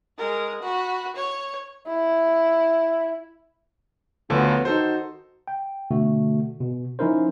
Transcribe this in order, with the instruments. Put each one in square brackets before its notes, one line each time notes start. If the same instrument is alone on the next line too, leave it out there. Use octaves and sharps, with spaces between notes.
[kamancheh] G#3 A#4
F#4 B5
C#5
[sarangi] E4
[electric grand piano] D2 D3 F3 [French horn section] F#3 B3
[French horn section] D#3 F#4 [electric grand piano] D#4 A4 C5
[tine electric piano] G5
B2 D3 A3 F#4
B2
F3 C#4 D#4 E4 A#4 C5